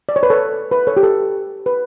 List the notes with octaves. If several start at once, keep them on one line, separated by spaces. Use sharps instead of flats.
D5
C#5
B4
A4 C#5
B4
A4 C#5
G4
A4
B4